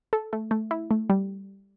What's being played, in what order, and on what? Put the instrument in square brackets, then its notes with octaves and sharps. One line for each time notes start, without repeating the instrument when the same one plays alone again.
[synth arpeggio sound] A4
A3
A3
E4
A3
G3